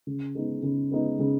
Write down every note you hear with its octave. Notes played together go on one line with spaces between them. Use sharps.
C#3
G#3 B3 D#4
C#3
G#3 B3 D#4
C#3